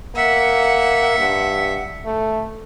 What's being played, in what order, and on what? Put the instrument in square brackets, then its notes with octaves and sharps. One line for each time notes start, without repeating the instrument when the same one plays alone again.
[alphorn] A#3 [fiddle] E5 [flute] F#5
[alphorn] G2
A3